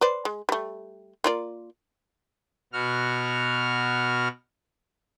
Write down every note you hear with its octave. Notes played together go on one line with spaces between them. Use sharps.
B4 C5 D5
G#3
G3 A3
A#3 F4 D5
B2 F#4 F6